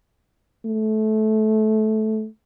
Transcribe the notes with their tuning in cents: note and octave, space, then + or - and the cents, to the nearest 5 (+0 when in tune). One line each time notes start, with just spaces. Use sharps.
A3 -20